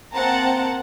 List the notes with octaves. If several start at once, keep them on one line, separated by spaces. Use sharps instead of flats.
A#3 C4 F#5 A5 A#5